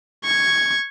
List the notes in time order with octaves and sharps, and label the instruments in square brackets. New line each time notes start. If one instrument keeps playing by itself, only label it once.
[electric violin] C#6 G#6